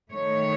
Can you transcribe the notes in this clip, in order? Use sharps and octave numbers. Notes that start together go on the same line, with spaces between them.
D#3 A3 C#5